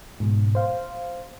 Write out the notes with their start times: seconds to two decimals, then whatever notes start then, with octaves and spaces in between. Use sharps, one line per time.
0.20 G#2 B2
0.55 C5 F5